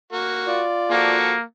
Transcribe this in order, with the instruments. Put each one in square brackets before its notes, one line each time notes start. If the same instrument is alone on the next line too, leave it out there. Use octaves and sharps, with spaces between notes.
[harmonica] A#3 F#4
[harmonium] F4 D5
[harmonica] F3 F#4 A4 [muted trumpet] A#3